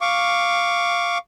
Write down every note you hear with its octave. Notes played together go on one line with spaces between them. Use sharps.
F5 C#6 D6